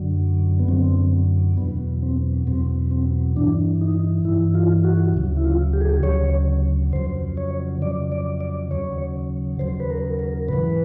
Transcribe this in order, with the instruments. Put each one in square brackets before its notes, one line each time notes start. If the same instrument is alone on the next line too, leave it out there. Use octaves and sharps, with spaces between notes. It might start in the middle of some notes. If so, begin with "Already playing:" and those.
Already playing: [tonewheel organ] F#2 D3 F#3
B3
F#2 D3 F#3 C4
E2 B2 F#3 B3
C4
E2 B2 F#3 C4
C4
G2 E3 D4
D#4
G2 E3 E4
F4
F#4
D2 C#3 F#3
E4
F4
G4
G#4
G4
D2 C#3 F#3 C#5
F2 C#3 F#3 C5
C#5
F2 C#3 F#3 D5
D5
D5
D#2 C#3 F#3 C#5
D#2 C#3 F#3 C5
B4
A#4
A#4
G#2 E3 B4